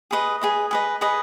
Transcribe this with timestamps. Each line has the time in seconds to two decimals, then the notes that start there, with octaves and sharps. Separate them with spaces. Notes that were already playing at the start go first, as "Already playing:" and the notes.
0.11 G#4 B4 D#5
0.41 G#4 B4 D#5
0.71 G#4 B4 D#5
1.01 G#4 B4 D#5